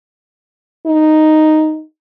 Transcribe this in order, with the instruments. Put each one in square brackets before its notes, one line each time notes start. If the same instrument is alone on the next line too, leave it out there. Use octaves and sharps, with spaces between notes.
[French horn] D#4